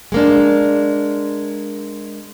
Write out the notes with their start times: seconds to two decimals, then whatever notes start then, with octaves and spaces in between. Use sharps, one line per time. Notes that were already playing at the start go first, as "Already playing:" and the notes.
0.12 G#3 A#3 D4